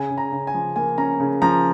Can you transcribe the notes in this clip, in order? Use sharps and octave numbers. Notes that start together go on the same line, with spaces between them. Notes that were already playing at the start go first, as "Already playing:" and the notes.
Already playing: C#3 G#5
C#3
A#5
C#3
G#5
F3
A#3 G#5
C#4 A#5
C#3
F3 A#5